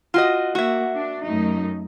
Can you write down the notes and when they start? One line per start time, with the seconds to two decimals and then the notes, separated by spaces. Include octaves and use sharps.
0.14 F4 F#4 D#5
0.55 A#3 F#4 E5
0.96 D4
1.25 F#2 A3 D#4